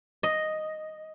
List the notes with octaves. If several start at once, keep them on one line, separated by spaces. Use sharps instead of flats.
D#5